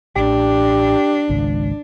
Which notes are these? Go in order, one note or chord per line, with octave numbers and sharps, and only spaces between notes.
A1 D4 G4
G#1 C#2